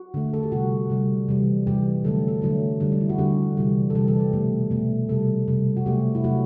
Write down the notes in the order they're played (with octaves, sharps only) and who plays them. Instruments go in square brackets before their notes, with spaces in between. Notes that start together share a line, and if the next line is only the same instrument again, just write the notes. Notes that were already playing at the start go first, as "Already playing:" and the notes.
Already playing: [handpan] F#4
D3 A3
A4
G4
C3 G3 F#4
C3 G3
C3 E3 G3
C3 E3 G3 G4
D3 F#3 A3 A4
A4
D3 F#3 A3
D3 G3
D4
E4
F#4
D3 G3 G4
C3 E3 G3
A4
C3 E3 G3 G4
A4
G4
B2 A3
B2 A3
C3 G3 A4
C3 G3
F#4
C3 F#3 A3 G4
E4
C3 F#3 A3 F#4